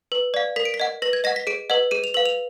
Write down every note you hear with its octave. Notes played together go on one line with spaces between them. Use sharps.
B4
D5 F5
A#4 B6
D7
B6
D#5 F#5
B4 A#6
G#6
D#5 F#5 A#6
B6
G#4 D7
B4 D#5 F#5
G#4 D#7
F7
B4 F5 F#7
F7